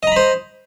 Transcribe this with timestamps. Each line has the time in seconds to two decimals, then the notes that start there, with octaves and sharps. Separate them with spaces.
0.03 D#5
0.07 A#5
0.12 B5
0.16 C5